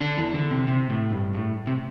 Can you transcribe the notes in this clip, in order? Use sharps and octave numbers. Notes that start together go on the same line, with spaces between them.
D3 D4
E2 E3
D3
C3
C3
A2
G2
A2
C3